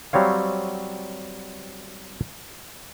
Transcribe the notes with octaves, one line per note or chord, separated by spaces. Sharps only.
F#3 G3 C4 C#5 F5